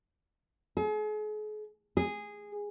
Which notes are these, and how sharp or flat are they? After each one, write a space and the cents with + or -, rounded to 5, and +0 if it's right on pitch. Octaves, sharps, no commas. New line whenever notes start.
G#4 +40
G#4 -10